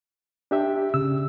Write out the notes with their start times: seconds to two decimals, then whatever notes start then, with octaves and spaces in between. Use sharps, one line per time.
0.51 D4 G4 E5
0.94 C#3 E6